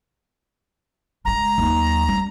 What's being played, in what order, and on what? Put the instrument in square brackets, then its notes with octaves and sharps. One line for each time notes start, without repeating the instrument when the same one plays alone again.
[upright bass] F#1 G#3 [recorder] A#5
[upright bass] D#2 F#3
G3 C#4